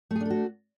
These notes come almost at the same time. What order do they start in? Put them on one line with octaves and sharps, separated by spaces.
A3 G#4 D4 A4 F#4